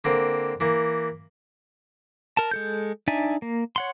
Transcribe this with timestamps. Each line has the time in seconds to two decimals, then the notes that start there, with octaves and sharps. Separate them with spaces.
0.04 D3 A#3 C4
0.60 E3 A#3
2.37 A#4 A5
2.51 G#3 A4 G6
3.08 D4 D#4 D5 E5 G#5
3.42 A#3
3.76 C#5 F#5 C6